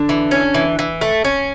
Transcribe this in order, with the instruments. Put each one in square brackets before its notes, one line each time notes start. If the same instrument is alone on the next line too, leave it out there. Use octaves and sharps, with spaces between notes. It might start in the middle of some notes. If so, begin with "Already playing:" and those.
Already playing: [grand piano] D3 D4
[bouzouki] E3
C#4
E3
E3
A3
C#4